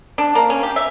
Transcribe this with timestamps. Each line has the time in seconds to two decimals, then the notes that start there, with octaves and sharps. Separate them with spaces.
0.18 D4
0.35 A#3
0.50 C#4
0.63 G4
0.76 E5